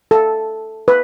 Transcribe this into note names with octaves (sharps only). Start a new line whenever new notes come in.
A4
B4